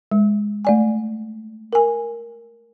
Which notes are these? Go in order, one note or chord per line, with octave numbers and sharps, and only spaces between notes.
G#3
A3 D5 G#5
A#4 G#5